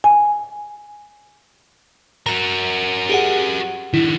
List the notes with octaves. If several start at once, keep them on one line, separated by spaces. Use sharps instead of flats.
G#5
F#4 A#4 A#5 F7
G4 G#4 F#5
D#3 D4 E4